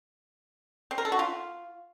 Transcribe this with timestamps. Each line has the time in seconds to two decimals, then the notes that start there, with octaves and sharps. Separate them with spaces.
0.91 C4
0.98 A#4
1.05 A4
1.12 F#4
1.19 F4